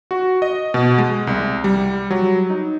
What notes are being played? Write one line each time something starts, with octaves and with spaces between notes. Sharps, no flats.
F#4
D#5
B2
G#3
C2
G3
F#3
D#4